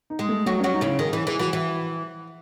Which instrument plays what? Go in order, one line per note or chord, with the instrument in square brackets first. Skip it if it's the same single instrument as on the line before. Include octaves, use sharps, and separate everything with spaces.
[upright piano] D#4
[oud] G#3 G#4
[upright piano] A3
[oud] F#3 F#4 [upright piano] A3
[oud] F#3 F#4 [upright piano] C#4
[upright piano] D#4
[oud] C#3 C#4 [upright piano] E4
[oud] D#3 [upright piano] G#4
[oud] E3 [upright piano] G#4
[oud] E3 [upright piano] G#4
[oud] E3 [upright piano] F#4
[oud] E3